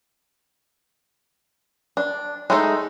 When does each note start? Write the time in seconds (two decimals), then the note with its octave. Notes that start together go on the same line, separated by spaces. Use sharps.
1.97 D4
2.50 G#3 A3 D#4 A4